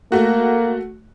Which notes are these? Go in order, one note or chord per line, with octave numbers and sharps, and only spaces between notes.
A3 A#3 F#4